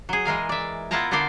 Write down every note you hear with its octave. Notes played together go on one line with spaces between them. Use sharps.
F#3 G#4
E3 G#3 A#4 F5
D5 E5
B3 E4 F4 A#4 A5 A#5
D3 B3 A#4 C5 D5 F5